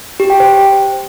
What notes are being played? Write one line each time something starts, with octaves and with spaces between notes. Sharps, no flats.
G4
G5
C5